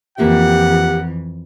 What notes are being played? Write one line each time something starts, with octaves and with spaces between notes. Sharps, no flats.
F2 E3 A#3 F4 G4 E5 F#5